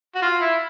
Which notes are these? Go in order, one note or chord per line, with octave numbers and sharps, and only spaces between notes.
F#4
F4
E4